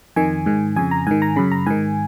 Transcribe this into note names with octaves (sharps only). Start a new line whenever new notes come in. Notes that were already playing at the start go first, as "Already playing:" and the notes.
F2 D#3 G#5
G#2 D#3
F2 C#3 G#5
A#5
G#2 D#3 G#5
A#5
F#2 C#3 B5
A#5
G#2 D#3 G#5